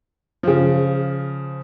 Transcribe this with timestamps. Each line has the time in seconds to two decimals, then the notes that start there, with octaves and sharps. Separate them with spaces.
0.43 C#3 F3